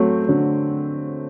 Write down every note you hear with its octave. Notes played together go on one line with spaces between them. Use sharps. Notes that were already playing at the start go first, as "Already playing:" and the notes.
Already playing: F#3 A3 C4
D3 F#3